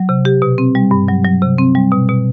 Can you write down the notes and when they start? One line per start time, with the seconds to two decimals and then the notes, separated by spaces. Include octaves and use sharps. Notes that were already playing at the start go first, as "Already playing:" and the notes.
Already playing: F#3
0.09 C3
0.25 G4
0.42 B2
0.58 C4
0.75 G3
0.91 G2
1.08 F#3
1.25 F#3
1.42 C3
1.58 C4
1.75 G3
1.92 B2
2.08 B2